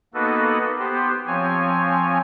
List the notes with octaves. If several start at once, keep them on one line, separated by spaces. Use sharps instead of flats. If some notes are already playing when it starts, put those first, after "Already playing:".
A#3 B3 D#4 F#4 A4 B4
B3 G4 C5
F3 C4 C#5 G#5